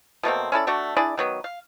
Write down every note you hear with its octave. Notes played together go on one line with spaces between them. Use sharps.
B2 A3 A#3 C4
C#4 E4 A4 D5
A3 D4 F#4
D4 E4 G#4 D5
D#3 F#3 B3
F5